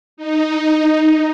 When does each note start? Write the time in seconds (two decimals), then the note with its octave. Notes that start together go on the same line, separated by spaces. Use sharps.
0.17 D#4